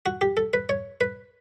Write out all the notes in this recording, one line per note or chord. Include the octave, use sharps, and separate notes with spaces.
F#4
G4
A4
B4
C#5
B4